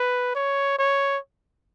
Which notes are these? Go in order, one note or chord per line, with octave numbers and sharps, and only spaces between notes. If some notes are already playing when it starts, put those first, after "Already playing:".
Already playing: B4
C#5
C#5